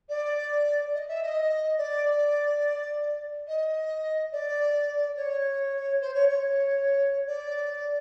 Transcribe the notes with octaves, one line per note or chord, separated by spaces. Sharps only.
D5
D#5
E5
D#5
D5
D#5
D5
C#5
C5
C#5
C#5
D5